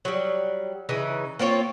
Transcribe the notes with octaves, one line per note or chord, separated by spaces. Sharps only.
F#3 G3
C#3 E3 D#4
A#3 C4 F4 C#5